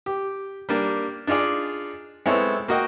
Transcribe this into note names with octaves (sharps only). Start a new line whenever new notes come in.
G4
G3 A#3 D4
D4 D#4 F4 G#4 D5
G#3 B3 C4 E4 A4 C#5
A#3 F#4 D#5 G5